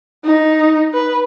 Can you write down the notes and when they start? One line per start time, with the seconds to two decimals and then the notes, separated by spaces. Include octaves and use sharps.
0.24 D#4
0.94 B4